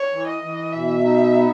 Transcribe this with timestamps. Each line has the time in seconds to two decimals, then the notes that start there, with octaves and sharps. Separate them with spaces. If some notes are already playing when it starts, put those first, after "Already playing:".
Already playing: C#5
0.12 E3
0.27 D#5
0.42 E3
0.73 B2 E5
1.04 D#4
1.33 B3